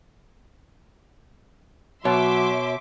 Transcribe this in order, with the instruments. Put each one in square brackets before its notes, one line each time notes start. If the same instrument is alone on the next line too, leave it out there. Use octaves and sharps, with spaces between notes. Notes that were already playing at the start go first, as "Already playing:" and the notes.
[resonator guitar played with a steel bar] B2 [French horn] F#3 [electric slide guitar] C#5 [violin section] E5 C6 D6